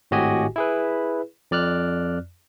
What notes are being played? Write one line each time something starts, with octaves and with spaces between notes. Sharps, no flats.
G#1 A2 F#4 G4 D#5 G#5
E4 G#4 B4
F2 D5 F6 F#6